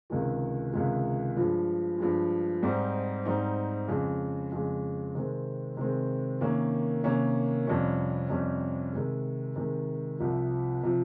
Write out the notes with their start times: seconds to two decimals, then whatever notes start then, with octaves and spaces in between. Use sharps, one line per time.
0.10 C#2 C3 D#3 G#3
0.73 C#2 C3 D#3 G#3
1.36 G2 F3 G#3
1.98 G2 F3 G#3
2.63 G#2 G3 C4 D#4
3.25 G#2 G3 C4 D#4
3.88 F2 C#3 G#3
4.52 F2 C#3 G#3
5.15 C3 D#3 G#3 C4
5.77 C3 D#3 G#3 C4
6.41 C3 D#3 A#3 C#4
7.04 C3 D#3 A#3 C#4
7.67 F2 C3 G3 C#4
8.29 F2 C3 G3 C#4
8.93 C3 D#3 G#3
9.56 C3 D#3 G#3
10.19 C2 C3 F3
10.83 C3 F3